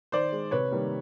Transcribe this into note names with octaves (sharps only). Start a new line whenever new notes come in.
D#3 C5 D5
G#3
C3 B4 C#5
D#3 G3 A#3